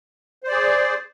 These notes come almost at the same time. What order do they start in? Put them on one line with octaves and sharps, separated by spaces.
C5 D5 G#4